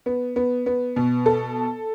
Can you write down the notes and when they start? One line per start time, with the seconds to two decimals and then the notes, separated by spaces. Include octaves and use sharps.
0.06 B3
0.36 B3
0.66 B3
0.96 B2
1.26 A4